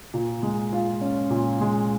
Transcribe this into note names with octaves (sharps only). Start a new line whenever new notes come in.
A#2
G#3
F4
C#4
A#2
G#3